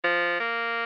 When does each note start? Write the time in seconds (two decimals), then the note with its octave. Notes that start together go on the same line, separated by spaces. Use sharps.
0.04 F3
0.40 A#3